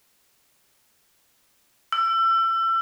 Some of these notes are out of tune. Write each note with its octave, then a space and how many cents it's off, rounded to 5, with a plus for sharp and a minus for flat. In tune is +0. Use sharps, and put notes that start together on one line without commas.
E6 +30